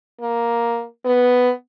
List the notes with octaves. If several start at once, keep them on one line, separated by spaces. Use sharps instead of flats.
A#3
B3